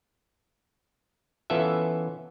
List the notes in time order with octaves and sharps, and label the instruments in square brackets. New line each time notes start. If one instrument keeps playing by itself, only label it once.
[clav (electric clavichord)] E3 B3 C#4 F4 A4 E5